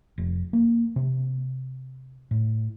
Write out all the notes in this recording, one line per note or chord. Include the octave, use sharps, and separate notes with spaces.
F1
A#3
C3
A2